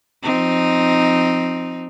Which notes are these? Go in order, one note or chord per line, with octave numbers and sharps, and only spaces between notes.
F3 C4 D#4